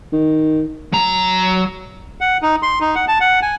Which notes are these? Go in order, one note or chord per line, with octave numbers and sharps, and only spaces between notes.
D#3
F#3 A#5
F#5
D#4
C6
D#4
F#5
A5
F#5
G#5